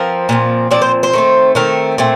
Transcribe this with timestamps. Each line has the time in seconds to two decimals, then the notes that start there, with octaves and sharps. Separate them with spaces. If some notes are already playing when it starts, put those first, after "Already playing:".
Already playing: F3 C4 A#4
0.29 A#2 F3 C4
0.71 A#2 F3 C4 D5
0.82 C5
1.03 C5
1.13 D#3 A3 C4
1.55 D#3 A3 C4 A#4
1.98 A#2 A3 C4